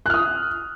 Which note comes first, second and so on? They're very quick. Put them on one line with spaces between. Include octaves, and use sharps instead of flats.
F#6 F6 D#6